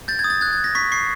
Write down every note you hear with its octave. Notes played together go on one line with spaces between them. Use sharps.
G6 A6
G#6
D#6
A6
F#6 G#6
G#6
F#6
A#6
C#6 B6
C#6 C7